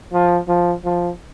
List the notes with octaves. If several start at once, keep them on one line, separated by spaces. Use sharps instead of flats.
F3
F3
F3